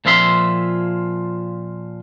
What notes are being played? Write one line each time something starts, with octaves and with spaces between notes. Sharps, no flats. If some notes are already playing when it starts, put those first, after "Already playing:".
A#2 F3 F4 E5 C6